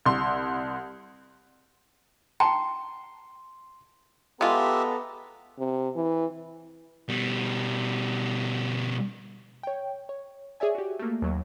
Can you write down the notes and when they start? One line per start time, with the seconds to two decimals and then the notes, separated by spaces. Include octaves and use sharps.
0.06 C2 C6
2.40 G5 A5 A#5 C6
4.41 G#3 B3 F4 G4 A4 E5 A#5
5.59 C3
5.95 E3
7.09 B2 G3
9.63 C#5 G5
10.09 C#5
10.60 G#4 C#5 D5 E5 G#5
10.75 F#4 G4
10.99 A3 A#3
11.22 D#2 F#3